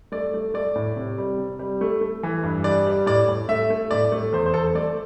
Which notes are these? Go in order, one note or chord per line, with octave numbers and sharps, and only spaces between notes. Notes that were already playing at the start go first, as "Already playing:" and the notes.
A3 D5
A3
A3 D5
A2
C3
G3
C3
G3
A3
A3
E3
G2
G3 D5
G3
A2 D5
A2
A3 E5
A3
A2 D5
A3
E2 C5
C5
E2 A4
A3 D5